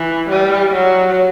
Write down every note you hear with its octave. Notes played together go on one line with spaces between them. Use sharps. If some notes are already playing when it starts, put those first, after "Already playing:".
Already playing: E3
G3
F#3